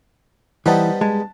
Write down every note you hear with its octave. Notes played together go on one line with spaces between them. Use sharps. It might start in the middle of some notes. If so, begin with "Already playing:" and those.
E3 G3 B3 D#4 C5 F#5 A5
G#3 A5